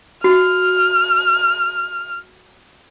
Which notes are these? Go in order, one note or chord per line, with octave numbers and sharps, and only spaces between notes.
F#4 F6